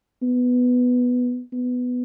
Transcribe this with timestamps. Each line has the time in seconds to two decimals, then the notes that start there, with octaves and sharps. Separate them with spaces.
0.23 B3
1.53 B3